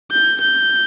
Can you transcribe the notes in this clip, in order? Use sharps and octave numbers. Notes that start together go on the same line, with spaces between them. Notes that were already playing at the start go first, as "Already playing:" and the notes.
G6
G6